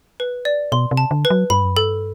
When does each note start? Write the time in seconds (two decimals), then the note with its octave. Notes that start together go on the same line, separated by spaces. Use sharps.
0.20 B4
0.45 D5
0.72 B2 C6
0.91 C3
0.97 A5
1.11 D3
1.25 B4
1.30 F#3
1.50 G2 B5
1.64 F#2
1.77 G2 A4